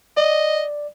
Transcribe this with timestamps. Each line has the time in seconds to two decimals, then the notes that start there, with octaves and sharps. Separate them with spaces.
0.17 D5 D#5